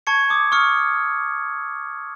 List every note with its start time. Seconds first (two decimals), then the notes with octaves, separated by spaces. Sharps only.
0.07 A5 C#6 G#6 C#7
0.30 D6 D#6
0.52 C#6 D#6 F6 C#7